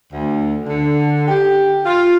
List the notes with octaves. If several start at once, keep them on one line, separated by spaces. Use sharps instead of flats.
D2
D3
G4
F4